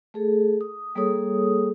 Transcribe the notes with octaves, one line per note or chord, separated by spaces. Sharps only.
A3 G#4 A4
D#6
G3 A#3 G#4 A4 C#5 D#6